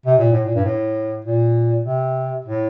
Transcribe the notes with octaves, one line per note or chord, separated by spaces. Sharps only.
C3
A#2
A2
A#2
G2
A2
A#2
C3
A2